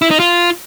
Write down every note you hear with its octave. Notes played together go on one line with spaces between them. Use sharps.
E4
D#4
F4